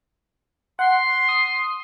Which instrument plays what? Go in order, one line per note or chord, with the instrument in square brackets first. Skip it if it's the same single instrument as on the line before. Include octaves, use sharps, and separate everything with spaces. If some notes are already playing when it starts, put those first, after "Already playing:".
[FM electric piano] F#5 [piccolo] C6
[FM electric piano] D#6